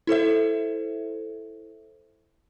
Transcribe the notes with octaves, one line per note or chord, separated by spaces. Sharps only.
E4 A4 C5 E5